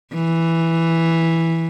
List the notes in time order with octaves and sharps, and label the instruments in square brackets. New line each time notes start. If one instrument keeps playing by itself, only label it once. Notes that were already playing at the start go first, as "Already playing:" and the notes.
[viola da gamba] E3